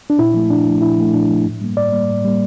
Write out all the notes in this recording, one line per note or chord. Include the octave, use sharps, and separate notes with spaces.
D4
A#2 E4
F3 A3
A#2 D4
F3 A3
A#2 E4
F3 A3
A#2 D4
F3 A3
A2
G3 A#3
A2 D5
G3 A#3
A2
G3 A#3